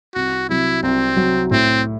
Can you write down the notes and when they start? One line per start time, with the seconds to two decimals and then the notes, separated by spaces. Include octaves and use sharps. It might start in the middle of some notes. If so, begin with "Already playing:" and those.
0.15 C2 F#4
0.49 C3 F#3 E4
0.83 C2 C4
1.17 C3 F#3
1.51 A2 C4